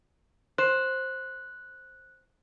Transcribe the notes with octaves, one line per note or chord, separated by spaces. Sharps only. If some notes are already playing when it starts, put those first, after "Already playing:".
C5 F#6